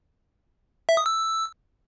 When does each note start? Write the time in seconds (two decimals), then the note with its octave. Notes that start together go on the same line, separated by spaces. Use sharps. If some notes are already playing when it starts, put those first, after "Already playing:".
0.89 E5
0.97 D#6
1.06 E6